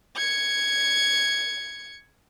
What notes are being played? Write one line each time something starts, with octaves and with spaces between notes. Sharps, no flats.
G#6 C#7